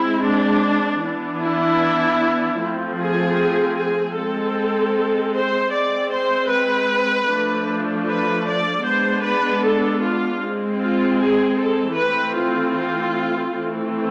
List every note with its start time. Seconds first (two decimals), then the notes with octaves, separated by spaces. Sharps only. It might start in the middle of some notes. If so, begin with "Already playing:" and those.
Already playing: G#3 C4 E4
0.26 D4
1.04 E3 B3 D4
1.43 E4
2.60 F3 A3 C4
2.98 G#4
3.77 G#4
4.15 G#3 C4 A4
5.34 C5
5.72 G#3 C4 D5
6.11 C5
6.50 B4
7.28 F3 A3 D4
8.07 B4
8.45 D5
8.84 G#3 B3 D4 C5
9.23 B4
9.63 A4
10.02 F4
10.40 G#3 C4
10.79 F4
11.19 G#4
11.58 A4
11.96 E3 A3 C4 B4
12.36 F4
12.75 F4
13.53 E3 A3 C4